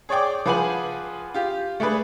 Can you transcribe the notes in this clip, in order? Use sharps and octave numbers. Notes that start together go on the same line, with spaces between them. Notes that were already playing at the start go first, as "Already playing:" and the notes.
G#4 C#5 D5 G5 D6
F3 G#4 B4 F#5 G#5 F#7
F4 G4
A3 D4 G#4 B4